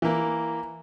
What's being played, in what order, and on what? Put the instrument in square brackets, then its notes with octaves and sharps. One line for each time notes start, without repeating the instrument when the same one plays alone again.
[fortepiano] E3 A#3